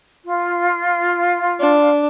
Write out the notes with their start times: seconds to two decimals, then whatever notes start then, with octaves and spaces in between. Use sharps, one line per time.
0.25 F4
1.60 D4